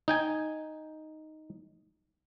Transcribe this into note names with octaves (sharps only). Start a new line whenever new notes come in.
D#4 G5 G#5